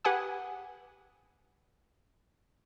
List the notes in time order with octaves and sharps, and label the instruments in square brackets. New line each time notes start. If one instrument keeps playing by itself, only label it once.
[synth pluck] G4 B4 F#5 G#5 D#6